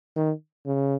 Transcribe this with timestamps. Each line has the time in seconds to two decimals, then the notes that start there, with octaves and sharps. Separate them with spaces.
0.16 D#3
0.66 C#3